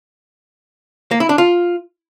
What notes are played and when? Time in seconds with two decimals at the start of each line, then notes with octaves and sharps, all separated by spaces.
1.11 A#3
1.20 E4
1.29 D4
1.38 F4